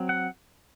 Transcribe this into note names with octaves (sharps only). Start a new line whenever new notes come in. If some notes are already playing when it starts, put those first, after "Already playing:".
Already playing: F#3 C4
F#5